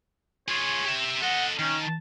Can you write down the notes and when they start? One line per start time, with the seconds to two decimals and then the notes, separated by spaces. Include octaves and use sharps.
0.48 F4 G#4 C#5
0.86 G4 E5
1.22 A4 D#5 F#5
1.59 D#3 C#4
1.82 A5